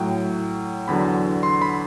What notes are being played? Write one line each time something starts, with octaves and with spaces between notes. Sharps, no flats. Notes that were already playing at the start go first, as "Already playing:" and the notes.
Already playing: A2 F#3 G5
E2 D3 F#3 B5
C6
B5